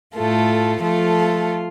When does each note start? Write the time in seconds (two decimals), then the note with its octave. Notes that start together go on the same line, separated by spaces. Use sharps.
0.14 A2 A3 F4 A4
0.82 F3 A3 F4 A4